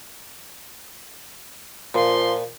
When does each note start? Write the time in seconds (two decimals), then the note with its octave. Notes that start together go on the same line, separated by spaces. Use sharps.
1.94 A#2 F3 C6